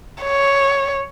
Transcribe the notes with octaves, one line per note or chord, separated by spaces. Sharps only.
C#5